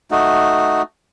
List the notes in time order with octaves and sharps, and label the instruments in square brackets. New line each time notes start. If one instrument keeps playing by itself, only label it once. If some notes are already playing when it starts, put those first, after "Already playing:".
[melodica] A3 D#4 F#4